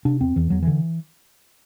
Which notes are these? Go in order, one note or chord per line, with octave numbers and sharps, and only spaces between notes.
C3 D4
E2 C4
E2 E3
E2 F#3
D3 E3